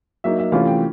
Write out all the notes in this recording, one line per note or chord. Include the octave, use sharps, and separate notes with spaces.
F#3 A#3 D#4 E5
E5
C3 E3 A3 C#4 F4 F5
G5